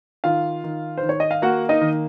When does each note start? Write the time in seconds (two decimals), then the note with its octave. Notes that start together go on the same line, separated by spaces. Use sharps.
0.24 D#3 F4 F5
0.64 D#3
0.98 C5
1.03 D#3
1.09 C#5
1.20 D#5
1.31 F5
1.42 A#3 F#4 F#5
1.69 D#4 D#5
1.81 D#3